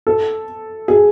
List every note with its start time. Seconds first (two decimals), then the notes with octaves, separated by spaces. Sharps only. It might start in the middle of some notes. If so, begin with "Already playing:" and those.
0.07 A4
0.88 G#4